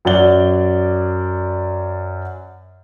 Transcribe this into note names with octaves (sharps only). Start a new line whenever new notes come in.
F#2 F#3 D5 G7